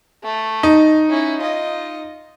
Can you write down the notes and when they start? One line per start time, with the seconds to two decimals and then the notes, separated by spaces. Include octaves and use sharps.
0.24 A3
0.63 D#4
1.09 C#4 E4
1.40 F4 D#5